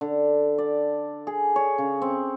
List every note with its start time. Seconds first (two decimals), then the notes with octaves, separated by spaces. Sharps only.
0.01 D3
0.58 D5
1.27 G#4
1.56 C#5
1.78 C#3
2.02 C4